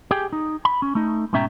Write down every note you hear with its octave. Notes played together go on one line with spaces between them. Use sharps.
G4 G#4 G5
D#4
B5
C#4
A3 D#4
G#2 B2 C#4 E5 G5 A#5